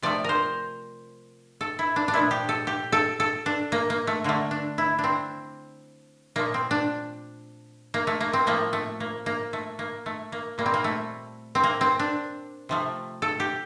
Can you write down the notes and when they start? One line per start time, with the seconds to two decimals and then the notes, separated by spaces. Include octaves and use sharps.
0.02 C3 F3 A3 D5
0.24 A#4 C5
1.61 A4
1.79 E4
1.96 D4
2.08 D4
2.13 A#2 F3 A3 E4
2.31 G4
2.49 A4
2.67 G4
2.92 A4
3.20 A4
3.46 D4
3.72 A#3
3.90 A#3
4.07 A3
4.24 D3 A3 A#3
4.51 D4
4.78 E4
4.99 D4
5.04 C4
6.36 A#2 F3 A3 A#3
6.54 C4
6.71 D4
7.94 A#3
8.07 A3
8.20 A#3
8.33 C4
8.46 A2 F3 A3 A#3
8.73 A3
9.00 A#3
9.26 A#3
9.53 A3
9.79 A#3
10.06 A3
10.32 A#3
10.58 A#2 G3 A#3
10.66 C4
10.74 A#3
10.84 A3
11.55 C4
11.64 A#3
11.81 C4
11.99 D4
12.69 C3 F3 A3
13.22 A4
13.40 G4